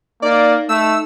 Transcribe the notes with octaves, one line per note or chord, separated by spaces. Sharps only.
A#3 D#4 D5
A3 E6